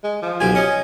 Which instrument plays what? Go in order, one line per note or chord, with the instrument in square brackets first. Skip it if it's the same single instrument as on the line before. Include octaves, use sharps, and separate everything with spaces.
[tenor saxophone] G#3
F3
[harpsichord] B1 G4 [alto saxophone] G#5
[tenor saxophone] C#4 [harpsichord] D#5